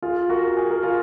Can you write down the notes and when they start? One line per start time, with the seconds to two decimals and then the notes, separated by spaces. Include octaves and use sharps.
0.02 F4 G#4
0.29 F#4 A#4
0.57 G#4
0.70 A#4
0.83 F4 G#4